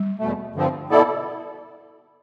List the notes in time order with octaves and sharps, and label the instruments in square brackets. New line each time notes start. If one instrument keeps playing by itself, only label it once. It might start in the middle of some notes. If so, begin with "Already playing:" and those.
Already playing: [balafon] G3
[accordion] E2 B2 A3
G2 D3 F3 C4
B2 B3 E4 A4 D5